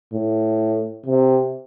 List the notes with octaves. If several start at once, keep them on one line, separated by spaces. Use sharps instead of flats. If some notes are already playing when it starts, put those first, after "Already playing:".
A2
C3